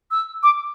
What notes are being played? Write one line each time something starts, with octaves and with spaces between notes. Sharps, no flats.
E6
D6